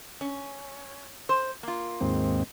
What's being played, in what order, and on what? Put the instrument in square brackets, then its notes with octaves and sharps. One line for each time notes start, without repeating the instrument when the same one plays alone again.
[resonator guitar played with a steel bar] C#4
C5
A#3 F4
[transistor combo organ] D#2 G#2 C4